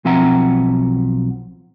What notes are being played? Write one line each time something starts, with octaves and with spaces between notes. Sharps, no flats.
B1 F3 C4 E5 F#5 A#5